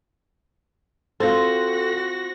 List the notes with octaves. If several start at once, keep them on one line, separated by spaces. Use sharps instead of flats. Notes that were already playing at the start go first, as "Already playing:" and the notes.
C4 F4 F#4 A4 A#6